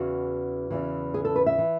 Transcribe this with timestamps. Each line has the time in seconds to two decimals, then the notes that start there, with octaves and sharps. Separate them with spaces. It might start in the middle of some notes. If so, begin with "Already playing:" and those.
Already playing: E2 C#3 E3 F#4
0.71 E2 C#3 E3
1.14 G#4
1.25 A4
1.36 B4
1.46 E5
1.58 E3